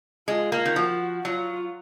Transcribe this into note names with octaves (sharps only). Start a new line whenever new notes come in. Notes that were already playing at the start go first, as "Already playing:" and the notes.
G#3 F4
A#3
D#3
F3 F#4
F#3 F4